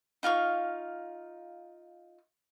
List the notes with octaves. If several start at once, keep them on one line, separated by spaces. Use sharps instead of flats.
D#4 F4 F5 C#6